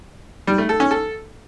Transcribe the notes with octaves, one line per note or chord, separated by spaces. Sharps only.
G3
A3
A4
C#4
A4